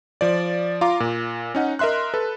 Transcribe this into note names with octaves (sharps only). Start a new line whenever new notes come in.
F3 D5
F4 F5 A#5 D6
A#2
C#4 D#4 F#5
A#4 D#5 E5 C6 F#6
A4 B4